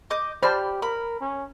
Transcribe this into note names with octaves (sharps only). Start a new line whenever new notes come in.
D#5 D6 G6
G4 C5 D5 A5 B5 F6
A#4 B5
C#4